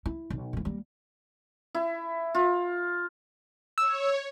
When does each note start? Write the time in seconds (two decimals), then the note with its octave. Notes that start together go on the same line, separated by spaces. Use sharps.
0.06 E4
0.30 B1
0.53 A2 E3
0.65 G3 A#3
1.75 E4
2.35 F4
3.78 C#5 E6